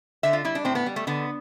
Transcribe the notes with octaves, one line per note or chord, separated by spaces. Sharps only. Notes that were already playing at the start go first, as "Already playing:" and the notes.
D3 E5
F4
G3 E4
D4
A2 C4
B3
G3
A3
D3 B3